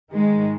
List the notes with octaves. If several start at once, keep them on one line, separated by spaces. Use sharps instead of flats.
G#2 D#3 G#3